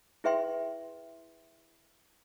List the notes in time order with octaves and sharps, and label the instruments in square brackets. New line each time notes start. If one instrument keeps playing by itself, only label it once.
[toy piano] E4 G#4 B4 E5 G5 C6